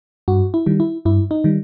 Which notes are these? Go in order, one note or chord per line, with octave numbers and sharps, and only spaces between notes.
G2 F#4
E4
D#3 G3
E4
G2 E4
D#4
D#3 G3